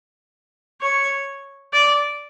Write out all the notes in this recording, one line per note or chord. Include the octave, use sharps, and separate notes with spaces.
C#5
D5